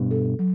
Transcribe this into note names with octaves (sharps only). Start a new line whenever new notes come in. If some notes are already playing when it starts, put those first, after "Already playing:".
Already playing: G2 B2
A4
F#3